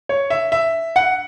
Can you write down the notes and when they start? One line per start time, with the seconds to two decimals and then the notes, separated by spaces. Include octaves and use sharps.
0.09 C#5
0.30 E5
0.52 E5
0.96 F#5